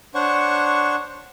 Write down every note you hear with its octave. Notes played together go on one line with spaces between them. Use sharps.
D4 C5 C#5 F#5 C#6